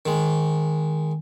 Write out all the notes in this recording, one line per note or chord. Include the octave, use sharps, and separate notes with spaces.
D#3 G#3